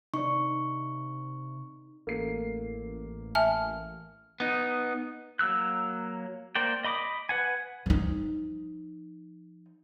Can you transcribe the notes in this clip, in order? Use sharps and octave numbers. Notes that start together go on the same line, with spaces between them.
C3 D#4 D5 C#6
A1 A#3 A4 C7
E5 G#5 A5 F6
B3 D#4
F#3 A#3 E6 F#6
A#3 A#4 C5 D5 G5
D#5 B5 D6 D#6
B4 F#5 G#5
F3 D#4